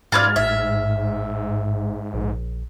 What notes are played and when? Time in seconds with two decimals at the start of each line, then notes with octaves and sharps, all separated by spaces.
0.12 G#2 F4 B4 D5 F6 G#6 A6
0.36 A1 A2 E5
2.14 A#1